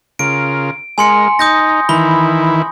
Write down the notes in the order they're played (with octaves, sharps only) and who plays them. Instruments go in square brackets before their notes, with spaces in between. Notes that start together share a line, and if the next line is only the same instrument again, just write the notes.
[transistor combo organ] C#3 F4 A#4 [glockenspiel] D7
[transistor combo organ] G#3 A#4 [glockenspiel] G#5 C6 C#7
[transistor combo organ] D#4 [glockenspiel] D#6 G6 A#6
[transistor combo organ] D#3 E3 E4 [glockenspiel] B5 G7